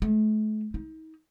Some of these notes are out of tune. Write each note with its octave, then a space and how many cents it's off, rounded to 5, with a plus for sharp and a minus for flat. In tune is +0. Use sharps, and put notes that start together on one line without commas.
A3 -40
D#4 +35